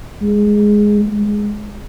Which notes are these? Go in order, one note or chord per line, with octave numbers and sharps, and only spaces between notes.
G#3
G#3